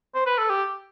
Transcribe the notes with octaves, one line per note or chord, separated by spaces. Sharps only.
C5
B4
A4
G4